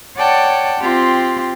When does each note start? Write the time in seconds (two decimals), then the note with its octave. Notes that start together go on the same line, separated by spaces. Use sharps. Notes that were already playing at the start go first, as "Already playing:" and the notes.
0.16 C#5 D5 F#5 G5 A5
0.81 C4 F4 G4